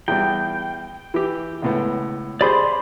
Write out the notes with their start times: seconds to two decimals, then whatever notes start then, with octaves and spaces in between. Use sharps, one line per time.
0.08 E2 G3 G5
1.14 E3 G4
1.62 C#2 A2 B3
2.41 G4 G#4 C5 D5 B5 C6